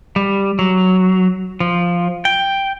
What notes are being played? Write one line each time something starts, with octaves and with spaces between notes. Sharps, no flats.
G3
F#3
F3
G5